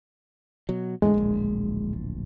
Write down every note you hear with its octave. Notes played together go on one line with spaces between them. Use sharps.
B2 F#3
E2 A2 D3 G#3
D1 A#1